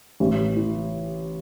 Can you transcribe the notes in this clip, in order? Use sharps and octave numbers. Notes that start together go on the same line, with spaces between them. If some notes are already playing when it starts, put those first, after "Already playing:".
A1
E3